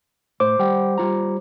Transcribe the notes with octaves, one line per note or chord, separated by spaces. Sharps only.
A2 C5 D6
G3 F#5 G5
G3 F4 A#5